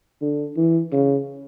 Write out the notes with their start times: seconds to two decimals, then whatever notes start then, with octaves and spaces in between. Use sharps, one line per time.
0.21 D3
0.56 E3
0.92 C#3